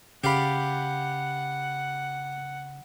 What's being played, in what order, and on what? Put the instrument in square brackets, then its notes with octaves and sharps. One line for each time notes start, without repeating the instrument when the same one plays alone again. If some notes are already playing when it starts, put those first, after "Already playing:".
[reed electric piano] C#3 B5 [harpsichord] G4 D5 F5 [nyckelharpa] F#5